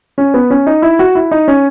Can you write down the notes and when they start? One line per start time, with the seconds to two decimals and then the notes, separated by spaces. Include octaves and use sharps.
0.18 C#4
0.34 B3
0.50 C#4
0.67 D#4
0.82 E4
0.99 F#4
1.15 E4
1.31 D#4
1.48 C#4